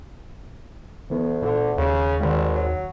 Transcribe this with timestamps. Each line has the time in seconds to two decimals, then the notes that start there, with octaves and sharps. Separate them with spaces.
1.10 D2 E3 B3
1.42 A#2 D3
1.78 D#2 C#3
2.20 G#1 D3 D#3 G3 G#3
2.55 F#3